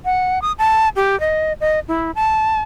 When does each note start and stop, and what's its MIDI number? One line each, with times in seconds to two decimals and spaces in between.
0.05 0.42 78
0.42 0.52 87
0.58 0.89 81
0.96 1.18 67
1.20 1.53 75
1.61 1.80 75
1.88 2.11 64
2.15 2.61 81